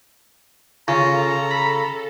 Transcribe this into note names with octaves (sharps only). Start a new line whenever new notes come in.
C#3 F4 A4 A#5
B5